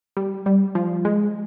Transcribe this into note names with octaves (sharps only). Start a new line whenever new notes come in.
G3
G3
F3
G#3